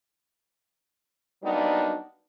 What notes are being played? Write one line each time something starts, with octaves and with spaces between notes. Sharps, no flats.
F#3 G3 A#3 B3 D4 D#4